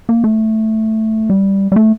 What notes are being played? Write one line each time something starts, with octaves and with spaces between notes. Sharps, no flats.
A#3
A3
G3
G3
A3